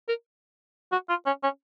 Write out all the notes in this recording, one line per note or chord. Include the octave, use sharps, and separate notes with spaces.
A#4
F#4
F4
C#4
C#4